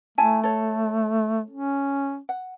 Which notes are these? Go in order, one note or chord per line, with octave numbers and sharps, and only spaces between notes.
A3 E4 G#5 A5
A4 C#5
C#4
F#5